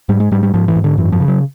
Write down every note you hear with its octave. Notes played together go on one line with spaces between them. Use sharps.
G#2 G3
G#3
G#2 G3
G3
G#2 F3
E3
G#2
D3
F#2 E3
F3
C#3
F#3